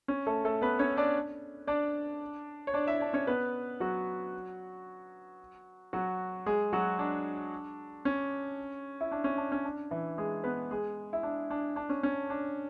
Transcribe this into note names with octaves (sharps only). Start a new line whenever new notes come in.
C#4
A3 A4
A3 A4
B3 B4
C#4 C#5
D4 D5
D4 D5
C#5
D4 D5
E4 E5
D4 D5
C#4 C#5
B3 B4
F#3 F#4
F#3 F#4
G#3 G#4
F#3 F#4
D4
C#4
E4
D4
C#4
D4
C#4
D4
E3 E4
G#3 G#4
B3 B4
G#3 G#4
E4
D4
D4
D4
C#4
C#4
D4